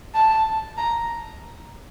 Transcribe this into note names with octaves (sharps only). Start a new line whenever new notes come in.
A5
A#5